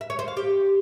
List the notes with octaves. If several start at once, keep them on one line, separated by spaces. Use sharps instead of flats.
E5
C#5
C5
F5
G4